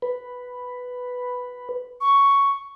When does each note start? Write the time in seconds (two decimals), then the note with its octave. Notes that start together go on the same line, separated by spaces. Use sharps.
0.02 B4
2.01 C#6